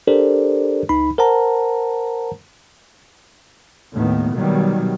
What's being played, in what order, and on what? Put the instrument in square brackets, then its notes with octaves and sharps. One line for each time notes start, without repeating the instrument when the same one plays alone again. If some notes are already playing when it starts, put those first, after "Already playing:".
[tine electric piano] D4 G4 A4 A#4 C5 D5
C#2 D#4 B5
A#4 C5 F#5 A5 A#5
[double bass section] D#2 A2 D#3 B3
B2 D#3 F#3 G3